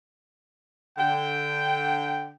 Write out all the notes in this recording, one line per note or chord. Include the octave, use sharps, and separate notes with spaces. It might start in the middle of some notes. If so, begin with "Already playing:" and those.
D3 G5